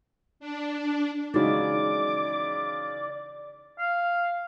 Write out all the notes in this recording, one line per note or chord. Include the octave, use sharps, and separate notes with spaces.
D4
C#3 E3 G#3 D#4 F#4 D5 D6
F5